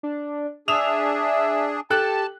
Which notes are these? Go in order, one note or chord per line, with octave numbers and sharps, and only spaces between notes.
D4
D4 G#4 E5 D#6 E7 F7
G4 A4 G5 A5 F#6